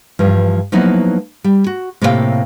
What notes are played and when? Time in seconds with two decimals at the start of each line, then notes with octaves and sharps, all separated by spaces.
0.19 G2 E3 F3
0.72 F3 F#3 A#3 B3 D#4 E4
1.44 G3
1.67 F#4
2.01 A2 C3 A#3 C#5 F5 G5